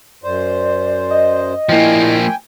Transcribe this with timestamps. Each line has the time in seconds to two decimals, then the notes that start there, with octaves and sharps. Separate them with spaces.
0.24 F#2 C5 D5
1.10 D#5
1.69 F3 A#3 E4 G5 G#5